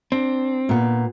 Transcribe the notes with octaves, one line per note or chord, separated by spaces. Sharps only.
C4 D4
A#2 B3